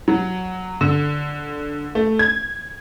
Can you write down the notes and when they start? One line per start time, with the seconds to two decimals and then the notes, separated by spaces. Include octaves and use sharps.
0.08 F#3
0.81 D3
1.95 A3
2.19 G#6